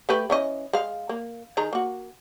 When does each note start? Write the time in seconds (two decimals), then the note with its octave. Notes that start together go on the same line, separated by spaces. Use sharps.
0.09 A3 G4 B4
0.30 E3 C#4 D#5
0.73 G#3 F5
1.09 A#3
1.57 D#3 G#4 A#5
1.73 A#3 F#4